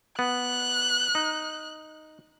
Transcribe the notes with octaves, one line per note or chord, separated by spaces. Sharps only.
B3 F#6
D#4